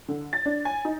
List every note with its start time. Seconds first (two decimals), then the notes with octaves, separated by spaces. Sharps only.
0.08 D3
0.33 A6
0.46 D4
0.65 G#5
0.85 D#4